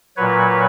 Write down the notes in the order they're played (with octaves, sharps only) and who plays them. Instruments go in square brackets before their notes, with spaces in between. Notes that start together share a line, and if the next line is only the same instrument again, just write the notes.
[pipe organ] A#2 F#3 B4 C#5